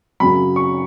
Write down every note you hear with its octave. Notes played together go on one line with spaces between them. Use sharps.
F#2 C#3 F#3 B5
C#6